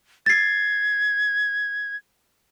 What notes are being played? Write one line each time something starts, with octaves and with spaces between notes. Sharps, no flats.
G#6 A6 C7